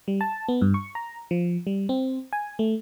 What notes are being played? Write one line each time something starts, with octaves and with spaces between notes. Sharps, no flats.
G3
A5
B3
G2
C#6
A#5
F3
G3
C4
G#5
A3